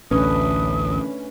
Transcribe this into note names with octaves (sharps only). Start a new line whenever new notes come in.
A1 D2 A3 C#4 D4 B4 D#6